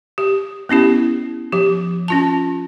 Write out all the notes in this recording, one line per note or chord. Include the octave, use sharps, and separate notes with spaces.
G4
B3 C#4 E4 G4
F3 G4
C#4 F4 A5